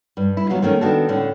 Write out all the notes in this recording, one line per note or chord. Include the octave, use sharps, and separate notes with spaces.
G2
E4
D#2 F#3 B3 F5
D#3 A3 A#3 C#4
D#3 B3 D4 F#4 A4
A2 D3 C#4